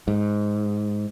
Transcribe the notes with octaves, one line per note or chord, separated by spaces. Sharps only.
G#2